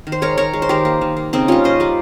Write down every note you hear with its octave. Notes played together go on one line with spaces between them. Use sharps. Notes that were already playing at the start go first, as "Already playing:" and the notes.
D#3
C5
G#3 A#4 C#5
D#3 A#4 C#5
G#3
C5
D#3 G4 A#4
A#3
D#3
A#3
C#3 C4 D#4
G3 A#3 C#4 F4
C#3 C5 D#5
G3 A#3